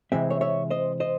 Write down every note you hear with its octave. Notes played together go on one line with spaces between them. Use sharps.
C3 E3 G#3 C4 E5
C#5 E5
C#5 E5
C5 D#5
C5 D#5